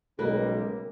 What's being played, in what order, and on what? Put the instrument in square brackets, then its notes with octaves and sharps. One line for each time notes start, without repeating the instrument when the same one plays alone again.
[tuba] B1 [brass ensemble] C#3 G3 G#3 [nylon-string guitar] A#3 A#4 B4